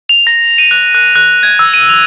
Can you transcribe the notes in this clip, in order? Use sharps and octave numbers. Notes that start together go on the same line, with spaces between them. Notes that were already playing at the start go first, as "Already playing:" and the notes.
F7
A#6
D#7
F#6
F#6
F#6
G#6
E6
D#7
F7